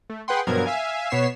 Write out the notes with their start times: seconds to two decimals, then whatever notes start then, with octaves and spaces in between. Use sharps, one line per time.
0.10 A3
0.28 G#4 B4 F#5 G5 C6
0.47 G2 B2 F3 F#3 A#4 G#6
0.66 E5 F5 G#5
1.10 B2 B3 C#5 B6 C7 E7